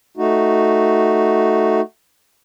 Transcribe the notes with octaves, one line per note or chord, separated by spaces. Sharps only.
A3 D#4 F#4